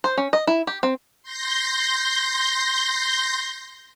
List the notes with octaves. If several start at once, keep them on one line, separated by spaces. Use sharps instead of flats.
C5
C#4
D#5
E4
G4
C4
C6 G6 A#6